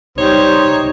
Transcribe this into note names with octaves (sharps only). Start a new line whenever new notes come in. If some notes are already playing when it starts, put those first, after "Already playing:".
G3 D#4 C5 C#5